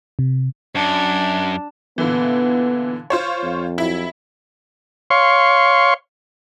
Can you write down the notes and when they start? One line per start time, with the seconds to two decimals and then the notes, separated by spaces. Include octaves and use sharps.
0.19 C3
0.75 F#2 D4
1.98 A#2 D3 E3 B3
3.10 F4 C5 C#5
3.43 F2
3.78 F#3 E4
5.10 C#5 F5 C6 C#6